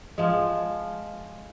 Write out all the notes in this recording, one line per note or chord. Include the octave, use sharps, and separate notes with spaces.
F3 G#3